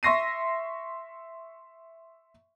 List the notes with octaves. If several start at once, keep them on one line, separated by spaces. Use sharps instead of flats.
E5 C6 C#6 A#6 C7 D#7